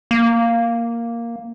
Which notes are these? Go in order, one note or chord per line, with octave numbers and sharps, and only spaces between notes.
A#3